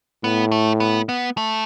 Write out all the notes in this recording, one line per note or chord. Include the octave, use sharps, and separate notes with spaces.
A2 B3
A3
B3
B3
A3